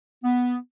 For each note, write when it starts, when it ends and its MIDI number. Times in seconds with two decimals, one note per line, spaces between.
0.24 0.56 59